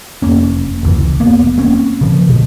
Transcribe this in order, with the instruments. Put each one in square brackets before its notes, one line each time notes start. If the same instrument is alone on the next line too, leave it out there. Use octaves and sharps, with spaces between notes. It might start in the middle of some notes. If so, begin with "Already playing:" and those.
[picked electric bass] F1 A#3 C#4
F1 C#2 E3
F1 A#3 B3
A#3 C4 C#4
C#3 F3
D2 B2